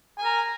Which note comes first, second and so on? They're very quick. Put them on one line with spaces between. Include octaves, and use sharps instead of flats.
G#5 A#4 A#5